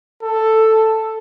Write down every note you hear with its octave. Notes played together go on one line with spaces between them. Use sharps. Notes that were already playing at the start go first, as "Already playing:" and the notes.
A4